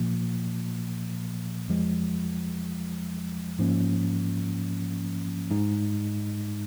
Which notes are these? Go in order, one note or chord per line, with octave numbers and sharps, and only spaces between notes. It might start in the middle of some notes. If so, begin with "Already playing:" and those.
Already playing: A#2 F3 A#3
F2 F3 G#3
G#2 F3 A#3 C#4
G#2 G#3 D#4